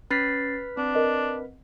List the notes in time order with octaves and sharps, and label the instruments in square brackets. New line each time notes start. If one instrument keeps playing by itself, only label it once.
[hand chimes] C#4 A6 C7 [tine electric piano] B4 F6 B6
[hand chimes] C4 [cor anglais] D4
[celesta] A#4 D#5